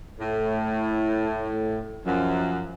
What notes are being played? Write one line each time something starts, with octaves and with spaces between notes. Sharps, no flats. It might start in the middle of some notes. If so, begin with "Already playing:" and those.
A2
F#2 F3